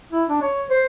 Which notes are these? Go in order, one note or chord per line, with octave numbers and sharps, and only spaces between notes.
E4
D4
C#5
C5